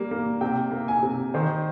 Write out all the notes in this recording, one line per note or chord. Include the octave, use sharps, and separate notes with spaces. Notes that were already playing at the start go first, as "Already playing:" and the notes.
Already playing: G3 A#3
A#3
C3 G5
A#3
G#5
C3
D#3 C5